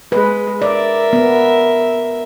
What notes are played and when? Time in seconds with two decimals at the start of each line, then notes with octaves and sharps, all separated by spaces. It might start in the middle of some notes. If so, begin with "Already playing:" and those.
0.12 G#3 B4
0.62 A#4 D5 E5
1.13 B3